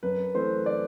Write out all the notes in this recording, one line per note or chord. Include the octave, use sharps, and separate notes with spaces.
F#2 B4
E3 A3 C4 C5
D5